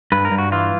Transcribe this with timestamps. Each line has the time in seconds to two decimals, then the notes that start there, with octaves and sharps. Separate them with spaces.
0.12 G2 B4
0.25 A#4
0.31 G2
0.38 F#4
0.52 E3 F4